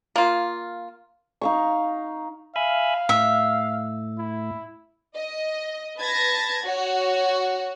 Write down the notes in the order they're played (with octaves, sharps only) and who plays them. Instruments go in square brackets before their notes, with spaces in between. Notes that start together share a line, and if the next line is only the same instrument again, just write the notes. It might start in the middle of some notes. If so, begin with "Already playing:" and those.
[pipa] A#3 F4
[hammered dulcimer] D#4 F5 C#6
[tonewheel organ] E5 G#5 B5 [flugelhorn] F5
[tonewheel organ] A2 [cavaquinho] E5
[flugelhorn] E4
[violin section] D#5
B4 A5 G#6 A#6
F#4 C#5